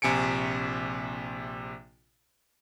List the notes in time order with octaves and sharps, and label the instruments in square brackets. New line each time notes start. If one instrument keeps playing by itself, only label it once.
[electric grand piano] A#1 C3 G#5 C#7 D7